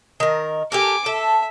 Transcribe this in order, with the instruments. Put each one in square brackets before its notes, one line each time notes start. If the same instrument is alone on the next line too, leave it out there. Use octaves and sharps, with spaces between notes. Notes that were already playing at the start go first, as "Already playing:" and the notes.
[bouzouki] D#3 A#4
[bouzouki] G4 A4 A#4 [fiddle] G#5 D6
[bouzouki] A4 [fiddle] E5